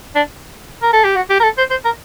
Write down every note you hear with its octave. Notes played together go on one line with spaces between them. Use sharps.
D4
A#4
A4
G4
F#4
G4
A#4
A4
C5
C5
A#4